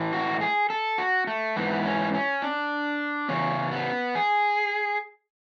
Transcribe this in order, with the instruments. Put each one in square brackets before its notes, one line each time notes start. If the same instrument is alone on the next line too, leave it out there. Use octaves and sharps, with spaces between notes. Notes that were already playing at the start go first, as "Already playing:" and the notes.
Already playing: [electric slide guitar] A2 E3
F#4
G#4
A4
F#4
A3
G#2 E3 B3
C#4
C#4
D4
E2 C#3 C#4
B3
G#4